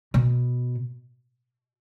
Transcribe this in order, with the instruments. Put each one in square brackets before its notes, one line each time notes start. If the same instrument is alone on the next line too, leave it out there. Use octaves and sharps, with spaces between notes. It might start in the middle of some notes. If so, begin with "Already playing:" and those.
[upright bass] B2